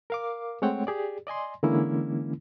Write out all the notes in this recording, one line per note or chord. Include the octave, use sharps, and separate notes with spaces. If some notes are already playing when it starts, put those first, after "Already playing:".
A#4 F5 D6
G#3 A3 C4 C#5 F#5 G5
G4 G#4 D5
D5 D#5 G#5 C6
D3 E3 G#3 A#3 C#4 E4